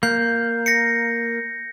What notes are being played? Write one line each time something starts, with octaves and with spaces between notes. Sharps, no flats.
A#3 G6 C7
A#6 C7 C#7